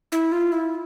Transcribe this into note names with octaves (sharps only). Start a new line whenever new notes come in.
E4
F4
E4